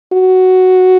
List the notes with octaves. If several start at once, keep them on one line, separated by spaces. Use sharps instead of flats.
F#4